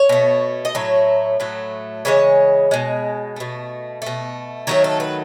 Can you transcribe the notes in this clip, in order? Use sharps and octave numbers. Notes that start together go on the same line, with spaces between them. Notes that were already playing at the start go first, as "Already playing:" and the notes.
Already playing: C#5
B2 A3
D#5
A2 F#3 A3 C#5
A2 F#3 A3
C#3 E3 G#3 C#5
B2 G#3
B2 A3
B2 A3
D#3 F#3 A3 C#5
A4
B4